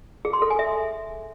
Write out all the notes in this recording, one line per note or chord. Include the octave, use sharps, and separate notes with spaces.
G#4
C6
A4
G#5
E5